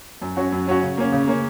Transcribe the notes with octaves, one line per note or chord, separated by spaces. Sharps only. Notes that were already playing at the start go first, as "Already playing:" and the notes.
F#2
F#3 C#4 F#4
F#2
F#3 C#4 F#4
C#3
A#3 C#4
C#3
A#3 C#4